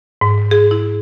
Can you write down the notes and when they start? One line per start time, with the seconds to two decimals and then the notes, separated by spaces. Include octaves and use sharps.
0.21 G#2
0.51 G#4
0.71 E4